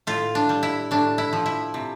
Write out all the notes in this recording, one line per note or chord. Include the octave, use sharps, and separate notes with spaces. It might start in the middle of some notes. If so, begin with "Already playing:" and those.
A2 F4
D4
G3
E4
A2 D4
E4
F3
E4
C3